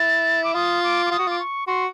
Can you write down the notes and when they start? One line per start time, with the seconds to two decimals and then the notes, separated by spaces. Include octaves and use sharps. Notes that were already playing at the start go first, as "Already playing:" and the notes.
Already playing: E4 A6
0.44 D6
0.55 F4 D#6
0.84 D6
1.06 D6
1.11 F4 D#6
1.19 F#4
1.27 F4 D6
1.39 C#6
1.67 F#4 C6